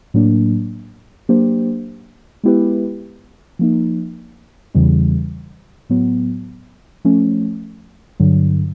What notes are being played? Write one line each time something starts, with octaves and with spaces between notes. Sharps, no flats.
A2 F#3 A#3 D4
F#3 A#3 D4 G4 C5
G#3 B3 E4 G4 B4
F3 A#3 D#4
E2 C#3 E3 G3
A2 F#3 B3
F3 A3 C#4
G2 D3 F#3